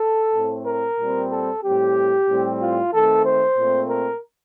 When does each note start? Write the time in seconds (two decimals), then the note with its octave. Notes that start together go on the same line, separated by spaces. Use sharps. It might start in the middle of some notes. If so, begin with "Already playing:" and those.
Already playing: A4
0.35 A2 A3 C4
0.67 A#4
0.99 A#2 G3 C4
1.31 A4
1.63 A2 G3 C4 G4
2.28 A2 G3 C4
2.61 F4
2.93 D#3 A3 C4 A4
3.26 C5
3.57 A#2 A3 C4
3.89 A#4